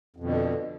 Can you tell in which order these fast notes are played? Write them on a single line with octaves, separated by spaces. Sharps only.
F2 B2 D3